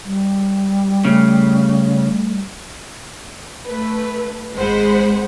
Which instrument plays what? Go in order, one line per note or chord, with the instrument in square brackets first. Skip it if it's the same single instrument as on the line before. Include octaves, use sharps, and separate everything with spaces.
[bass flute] G3
[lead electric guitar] C#3 [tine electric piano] A3
[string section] A3 B4
G#1 G#3 C5 F#5 B5